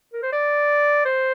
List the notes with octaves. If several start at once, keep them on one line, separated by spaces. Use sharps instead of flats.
A#4
C5
D5
C5